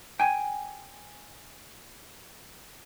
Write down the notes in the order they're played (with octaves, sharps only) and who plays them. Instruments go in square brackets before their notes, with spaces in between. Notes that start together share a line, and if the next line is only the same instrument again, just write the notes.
[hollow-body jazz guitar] G5 G#5